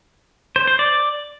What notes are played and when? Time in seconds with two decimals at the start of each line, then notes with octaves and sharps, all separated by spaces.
0.56 C5
0.67 C5
0.79 D5